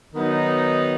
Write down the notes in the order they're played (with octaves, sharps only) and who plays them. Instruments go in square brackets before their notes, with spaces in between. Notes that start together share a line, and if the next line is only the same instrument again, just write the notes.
[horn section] D#3 F#3 B3 D#4